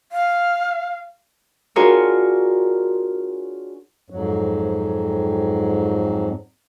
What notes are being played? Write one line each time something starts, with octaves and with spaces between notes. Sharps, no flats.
F5
D4 F4 F#4 G#4 A#4 C#5
F2 G#2 F#3